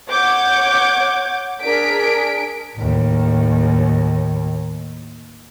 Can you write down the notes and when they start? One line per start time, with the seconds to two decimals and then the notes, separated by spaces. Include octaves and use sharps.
0.11 C#5 F#5 D6 G6 G#6
1.62 D4 G#4 A#4 B6 D7
2.76 D#2 A2